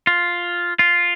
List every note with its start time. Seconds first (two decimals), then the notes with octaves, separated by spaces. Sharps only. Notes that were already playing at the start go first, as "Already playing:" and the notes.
0.07 F4
0.79 F4